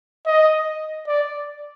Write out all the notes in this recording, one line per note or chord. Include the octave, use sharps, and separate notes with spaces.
D#5
D5